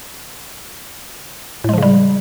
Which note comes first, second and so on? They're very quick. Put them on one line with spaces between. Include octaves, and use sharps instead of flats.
A2 G#3 F3 C#3 G3